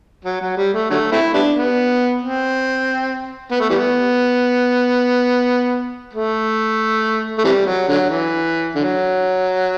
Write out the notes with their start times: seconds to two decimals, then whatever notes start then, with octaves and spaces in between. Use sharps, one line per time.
0.25 F#3
0.41 F#3
0.57 G3
0.74 A3
0.90 D3 F#3 A3
1.12 A3 C4 E4
1.34 G3 B3 D4
1.55 B3
2.21 C4
3.51 B3
3.61 A3
3.70 E3 G3 B3
6.13 A3
7.38 A3
7.44 C3 E3 G3
7.66 F#3
7.88 D3 F#3
8.09 E3
8.75 D3 F#3